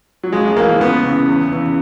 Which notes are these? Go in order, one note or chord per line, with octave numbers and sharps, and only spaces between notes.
F#3
A#1 G#3
G#3
G#2 E3 A#3
C#2 B3
C#3 E3
E2
C#3 E3